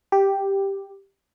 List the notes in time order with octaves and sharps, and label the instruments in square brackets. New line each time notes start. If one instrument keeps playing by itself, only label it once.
[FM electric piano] G4